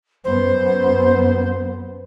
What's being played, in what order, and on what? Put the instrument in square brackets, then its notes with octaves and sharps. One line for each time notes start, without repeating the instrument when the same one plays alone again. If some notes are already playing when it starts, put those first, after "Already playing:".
[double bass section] F#2 B3 [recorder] C5